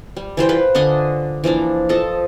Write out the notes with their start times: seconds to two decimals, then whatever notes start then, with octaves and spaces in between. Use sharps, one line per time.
0.16 G3
0.37 E3 G3 C5 G5
0.49 F4 B4 C5
0.75 D3 D4 D#5 G#5
1.44 E3 F3 A#3 D4
1.89 F3 A4 D#5